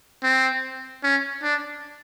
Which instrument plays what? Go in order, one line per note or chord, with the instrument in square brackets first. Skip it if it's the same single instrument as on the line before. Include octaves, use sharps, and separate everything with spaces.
[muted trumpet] C4
C#4
D4